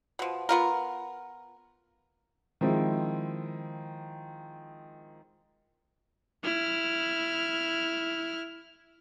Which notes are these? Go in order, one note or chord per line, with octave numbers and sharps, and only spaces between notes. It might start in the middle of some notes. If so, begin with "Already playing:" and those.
B2 F3
B3 F4 A#4
D#3 F3 G#3 C4 E4
E4 F6